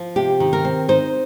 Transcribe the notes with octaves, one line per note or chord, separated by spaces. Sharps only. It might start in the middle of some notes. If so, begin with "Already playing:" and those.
Already playing: F3
C3 G4
D#3
A#4
C4
D#4 C5